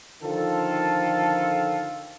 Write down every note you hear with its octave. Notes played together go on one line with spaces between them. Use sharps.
D3 D#3 F3 F4 A4